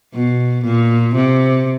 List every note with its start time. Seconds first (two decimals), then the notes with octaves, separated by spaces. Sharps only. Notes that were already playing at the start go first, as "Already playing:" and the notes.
0.13 B2
0.64 A#2
1.15 C3